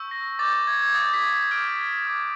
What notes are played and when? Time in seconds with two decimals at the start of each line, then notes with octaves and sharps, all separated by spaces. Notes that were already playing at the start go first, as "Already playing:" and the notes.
Already playing: C#6 E6 G6
0.11 A#6
0.39 D6 A6
0.43 G6
0.67 G#6
0.82 G#6
0.95 D#6 A6
0.98 G6
1.14 B6
1.51 D6 F6 D7
2.06 D6 F6